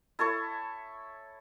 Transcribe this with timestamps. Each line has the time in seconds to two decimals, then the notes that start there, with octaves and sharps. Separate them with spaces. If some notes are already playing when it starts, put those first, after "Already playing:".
0.19 E4 A4 C#5 C#6